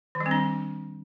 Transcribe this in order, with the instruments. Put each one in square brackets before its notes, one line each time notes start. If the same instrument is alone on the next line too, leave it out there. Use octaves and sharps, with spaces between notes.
[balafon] D#3
G3
C4
D4